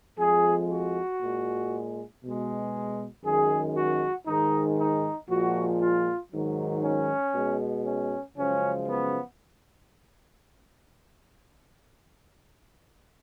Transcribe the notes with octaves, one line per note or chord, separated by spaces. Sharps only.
F2 F3 G#3 G#4
F#4
A#2 G#3
B2 G#3
F#2 D#3 G#3 G#4
F#4
G#2 D#3 G#3 D#4
D#4
A#2 F3 G#3 F#4
F4
G#2 D#3 F#3
C#4
B2 G#3
C#4
F#2 C#3 F3 G#3 C#4
B3